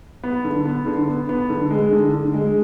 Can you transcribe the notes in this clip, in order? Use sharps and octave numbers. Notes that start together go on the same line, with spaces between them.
B3
D3
B3
D3
B3
B3
D3
G#3
D3
D3
G#3